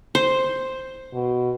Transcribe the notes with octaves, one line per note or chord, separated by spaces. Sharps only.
C5
B2